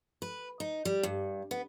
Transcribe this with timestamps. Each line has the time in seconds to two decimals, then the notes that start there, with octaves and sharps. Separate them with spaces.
0.22 B4
0.60 D#4
0.85 G3
1.03 G2
1.51 B3